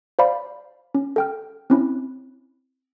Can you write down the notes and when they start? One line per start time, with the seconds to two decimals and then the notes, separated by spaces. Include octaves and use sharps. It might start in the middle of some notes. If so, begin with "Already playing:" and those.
0.19 C5 D5 F5 B5
0.95 C#4
1.16 A4 G5 F6
1.70 C4 C#4 E4